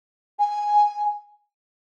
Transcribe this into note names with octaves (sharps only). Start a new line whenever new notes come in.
G#5